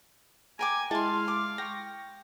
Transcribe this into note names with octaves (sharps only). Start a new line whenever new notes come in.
A#4 G5 G#5 D6
G#3 E4 F5 A5 C6
D6
G5 C#6 A#6